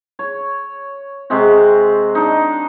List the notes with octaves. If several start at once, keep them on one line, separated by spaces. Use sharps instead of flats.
C#5
C3 G#3 C4 F#4
D4 D#4